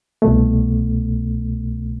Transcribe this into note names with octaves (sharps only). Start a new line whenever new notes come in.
C2 B2 A3